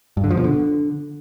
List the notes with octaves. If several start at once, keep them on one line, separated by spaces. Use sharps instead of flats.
G2
D3
F3
B2
D3